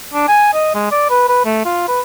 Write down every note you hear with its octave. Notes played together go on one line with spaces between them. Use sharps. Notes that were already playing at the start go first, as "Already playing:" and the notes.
D4
G#5
D#5
G#3
D5
B4
B4
A3
F4
B4